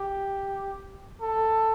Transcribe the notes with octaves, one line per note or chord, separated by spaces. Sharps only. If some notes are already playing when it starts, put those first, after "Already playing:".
Already playing: G4
A4